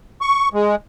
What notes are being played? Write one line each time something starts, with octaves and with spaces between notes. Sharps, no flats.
C#6
G#3